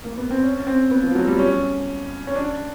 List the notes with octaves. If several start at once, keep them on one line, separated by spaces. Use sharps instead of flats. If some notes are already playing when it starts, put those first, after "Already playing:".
A#3
B3
C4
C#4
C4
B3
F3
F#3
G3
C#4
C#4
D4